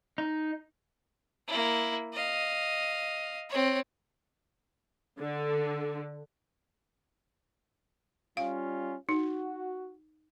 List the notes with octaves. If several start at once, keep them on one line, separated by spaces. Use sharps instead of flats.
D#4
A#3 E4
D#5 F5
C4 C#5
D3
G3 C#4 F4 F5
D#4 F#4